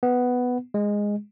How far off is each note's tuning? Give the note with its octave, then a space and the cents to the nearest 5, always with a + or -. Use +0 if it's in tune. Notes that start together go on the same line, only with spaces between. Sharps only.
B3 +5
G#3 -10